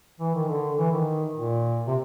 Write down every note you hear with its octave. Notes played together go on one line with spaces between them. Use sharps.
E3
D#3
D3
E3
D#3
A#2
C3